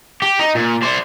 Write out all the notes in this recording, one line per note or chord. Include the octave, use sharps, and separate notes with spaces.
G4
D#4
A#2
C5 D5